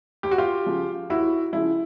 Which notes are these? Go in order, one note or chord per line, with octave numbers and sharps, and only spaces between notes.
D#2 G4
F#4
F4 G4
C#3 F3
D#2 E4 F#4
C#3 F3 E4